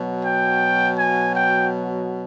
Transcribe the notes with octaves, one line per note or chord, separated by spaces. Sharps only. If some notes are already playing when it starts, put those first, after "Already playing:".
Already playing: B2 F#3
G5
G#5
G5